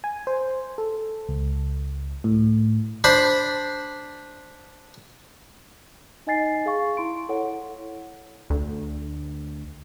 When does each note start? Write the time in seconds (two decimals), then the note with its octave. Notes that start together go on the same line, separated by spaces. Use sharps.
0.04 G#5
0.27 C5
0.78 A4
1.29 C#2
2.24 A2
3.04 D4 C5 B5
6.27 D#4 D#5 G#5 A6 C7
6.66 G#4 F5 C#6
6.97 E4 C6 D7
7.29 E4 A4 C#5 F#5
8.50 D2